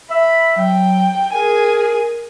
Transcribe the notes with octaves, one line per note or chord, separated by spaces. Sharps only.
E5 B5
F#3 G5
G#4 A#4 G#5